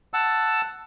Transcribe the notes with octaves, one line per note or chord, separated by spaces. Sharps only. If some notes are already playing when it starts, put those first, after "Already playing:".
F#5 A5 E6